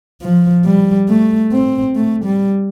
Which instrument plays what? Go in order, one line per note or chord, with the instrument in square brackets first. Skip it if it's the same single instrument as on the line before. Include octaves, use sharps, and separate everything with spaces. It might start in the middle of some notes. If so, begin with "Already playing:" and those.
[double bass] F3
G3
A3
C4
A3
G3